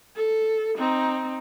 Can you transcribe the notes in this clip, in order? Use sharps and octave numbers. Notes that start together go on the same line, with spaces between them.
A4
C4 D#4